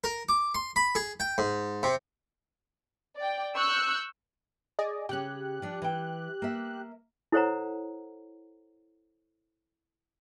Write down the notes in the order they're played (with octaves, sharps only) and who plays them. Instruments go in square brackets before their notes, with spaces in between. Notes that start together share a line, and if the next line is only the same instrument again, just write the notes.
[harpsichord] A#4
D6
C6
B5
G#4
G5
G#2
C3
[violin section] D5 G5
C#6 E6 F#6 G6
[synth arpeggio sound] G#4 D5 D#5
[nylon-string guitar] C#3 C#4 [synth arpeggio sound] G4 F#6
[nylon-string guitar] F3 D4
E3 G5
A#3 E5
[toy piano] E4 A4 C5 C#5 F#5 A#5